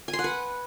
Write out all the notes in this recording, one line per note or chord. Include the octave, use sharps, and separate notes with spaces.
G#5
C6
F#5
B4